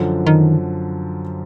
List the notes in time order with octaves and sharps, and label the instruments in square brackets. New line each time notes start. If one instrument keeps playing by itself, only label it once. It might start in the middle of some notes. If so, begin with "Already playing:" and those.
Already playing: [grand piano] F#2 D3 F3
[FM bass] D#3